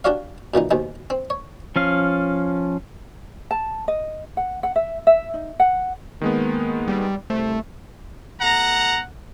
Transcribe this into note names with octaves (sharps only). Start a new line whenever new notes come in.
D4 F#4 G4 C#5 D5 F5
F#2 A#2 E3 D#4
D#2 G#2 B2 G#3
C4
C#5
F3 C#4 F5
A5
D#5
F#5
F#5
E5
E5
D#4
F#5
D#3 G#3 A#3 B3
G3
C2 A3 C5
B2 A3 F#5 A#5